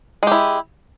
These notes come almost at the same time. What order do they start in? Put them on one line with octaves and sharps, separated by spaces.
G#3 G4 E4